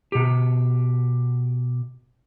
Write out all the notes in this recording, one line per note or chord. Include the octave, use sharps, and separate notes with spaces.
B2 G4